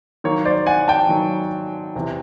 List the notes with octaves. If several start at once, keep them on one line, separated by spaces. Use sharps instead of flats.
D#3 F#3 A#3 C#5
C5 D5
F#5 G#5
G5 A5
D#3 F#3 A#3
E2 C3 E3